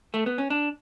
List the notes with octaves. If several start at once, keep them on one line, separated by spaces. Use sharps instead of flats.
A3
B3
C#4
D4